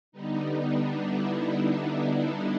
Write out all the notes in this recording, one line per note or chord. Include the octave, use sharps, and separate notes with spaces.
D3 G3 B3 D#4
D4
E4